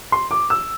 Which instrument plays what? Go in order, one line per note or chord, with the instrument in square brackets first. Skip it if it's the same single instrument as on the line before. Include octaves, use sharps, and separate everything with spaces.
[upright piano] C6
D6
E6